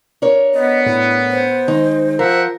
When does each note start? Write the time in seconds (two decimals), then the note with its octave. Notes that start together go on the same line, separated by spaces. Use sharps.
0.22 D4 A#4 C#5
0.54 B3 D#5
0.86 A2 E4
1.31 C5
1.68 D#3 G#3 D#4
2.19 F3 A#4 E5 F#5 G5